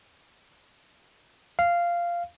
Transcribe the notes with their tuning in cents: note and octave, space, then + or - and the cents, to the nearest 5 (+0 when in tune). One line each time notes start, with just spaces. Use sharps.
F5 -10